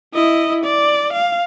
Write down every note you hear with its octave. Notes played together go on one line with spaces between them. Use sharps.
E4 D#5
D5
F5